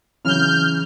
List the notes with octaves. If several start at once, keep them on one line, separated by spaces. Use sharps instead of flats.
C#3 E3 F#3 F6 G6